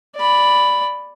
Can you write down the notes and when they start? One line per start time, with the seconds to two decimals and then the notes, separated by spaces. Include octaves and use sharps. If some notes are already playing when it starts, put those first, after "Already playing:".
0.16 D5 B5